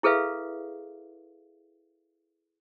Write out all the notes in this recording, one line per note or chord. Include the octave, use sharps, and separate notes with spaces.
E4 G#4 A4 B4 E5 F5